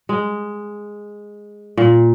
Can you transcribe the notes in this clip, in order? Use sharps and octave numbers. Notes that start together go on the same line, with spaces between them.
G#3
A#2